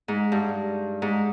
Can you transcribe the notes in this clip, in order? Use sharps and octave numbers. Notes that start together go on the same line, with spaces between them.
G#2
G2
G#2